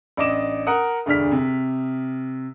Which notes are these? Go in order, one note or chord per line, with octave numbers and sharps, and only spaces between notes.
A1 D4 D#5 D6 E7
A#4 F#5 A#5 D#6
E1 D2 G2 D4 F6 B6
C3